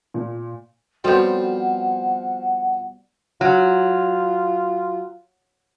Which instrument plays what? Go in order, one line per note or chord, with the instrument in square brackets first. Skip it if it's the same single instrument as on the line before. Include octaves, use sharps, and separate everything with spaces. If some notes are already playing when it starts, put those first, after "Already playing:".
[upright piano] A#2
[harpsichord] F3 C4 [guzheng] G3 B3 [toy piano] F#4 A4 C#5 [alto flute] F#5
[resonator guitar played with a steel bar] F#3 [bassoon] F4